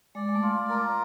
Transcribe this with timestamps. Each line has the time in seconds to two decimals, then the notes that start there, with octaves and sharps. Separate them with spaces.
0.15 G#3 D5
0.29 G#3
0.35 A3
0.42 F4
0.69 A#4